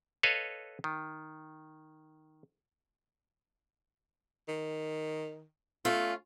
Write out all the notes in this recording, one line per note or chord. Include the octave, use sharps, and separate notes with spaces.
A4 B4 C#5 D#5 F5
D#3
D#3
A3 C#4 F4